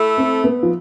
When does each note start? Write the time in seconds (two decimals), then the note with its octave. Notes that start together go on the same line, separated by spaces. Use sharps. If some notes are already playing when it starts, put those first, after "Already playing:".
Already playing: A3 E4 A4
0.17 C4
0.44 B3
0.63 F3